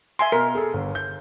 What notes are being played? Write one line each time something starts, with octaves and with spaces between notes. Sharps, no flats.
E5 G#5 C6
B2 A#4
G#4 A4
G1
G6